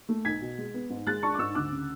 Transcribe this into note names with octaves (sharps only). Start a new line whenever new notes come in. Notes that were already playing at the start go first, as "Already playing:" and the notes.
A3
B1 G#6 B6
B2
G#3
B3
G#2
G#3 F#6 A6
D4 A5 C#6
D6
G#2 C#6 E6
D2 D6 F#6
C#3